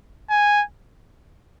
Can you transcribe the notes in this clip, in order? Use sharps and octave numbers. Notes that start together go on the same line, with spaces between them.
G#5